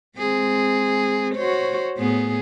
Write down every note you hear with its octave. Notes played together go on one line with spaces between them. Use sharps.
G#3 C4 G#4
F#4 C5 C#5
A2 B3 G#4